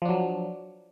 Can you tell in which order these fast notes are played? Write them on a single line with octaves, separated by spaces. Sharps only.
F3 D4 F#3